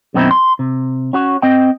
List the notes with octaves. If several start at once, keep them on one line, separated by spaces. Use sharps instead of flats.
F#2 B2 D#3 C4 D#4 E4
C6
C3
C#4 F#4 C#5
C4 D#5 G5